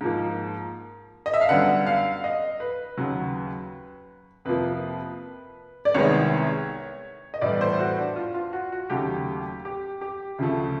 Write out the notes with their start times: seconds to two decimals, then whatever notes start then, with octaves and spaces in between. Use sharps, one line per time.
0.01 G#2 F3 A#3
1.26 D#5
1.34 E5
1.41 F5
1.49 F#2 D3 G3 B3 F#5
1.87 F5
2.24 D#5
2.60 B4
2.97 D#2 C#3 F#3
4.45 F2 C3 F3 A#3 B4
5.85 D5
5.94 C2 C3 D#3 G#3 B3 C#5
7.34 D#5
7.41 A2 E3 G3 B3 D5
7.61 C5
7.79 F#4
7.98 D4
8.16 F4
8.34 F4
8.53 F#4
8.72 F#4
8.90 D#2 C#3 F#3 A3 G4
9.65 G4
10.01 G4
10.39 D2 C#3 F3 A3